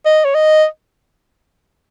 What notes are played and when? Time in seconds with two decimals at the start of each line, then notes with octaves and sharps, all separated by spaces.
0.06 D#5
0.25 C#5
0.35 D#5